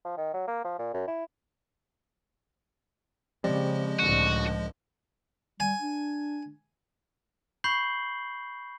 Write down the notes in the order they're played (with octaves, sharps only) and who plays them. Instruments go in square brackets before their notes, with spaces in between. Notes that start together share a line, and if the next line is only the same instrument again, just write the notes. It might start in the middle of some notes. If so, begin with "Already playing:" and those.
[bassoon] F3
D#3
F#3
A#3
F3
A#2
F#2
E4
[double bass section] C#3 [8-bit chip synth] F3 G#3 D#5 [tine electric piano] C4 G4 D5
[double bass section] C#2 A2 D3 [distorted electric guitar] F#4
[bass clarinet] G3 [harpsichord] G#5
[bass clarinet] D4
[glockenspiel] B5 C#6 G6 C7 F#7 G7